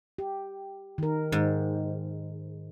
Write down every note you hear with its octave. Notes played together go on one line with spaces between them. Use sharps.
G4
D#3 A#4
G#2 D#3